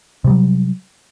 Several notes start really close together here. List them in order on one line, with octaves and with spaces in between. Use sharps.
C3 G3 F#3